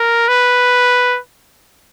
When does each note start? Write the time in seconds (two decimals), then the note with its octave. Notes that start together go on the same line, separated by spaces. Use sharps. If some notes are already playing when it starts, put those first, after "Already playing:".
Already playing: A#4
0.28 B4